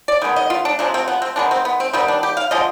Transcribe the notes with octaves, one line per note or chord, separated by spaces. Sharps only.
D5
D#3 G#3 B3
D#5
F4
D4
C3 F3 G#3 D4
C4
B3
C4
D#3 G#3 B3 D4
C4
B3
C4
D#3 G3 B3 C4
D4
G4
F5
D3 F3 G#3 D#5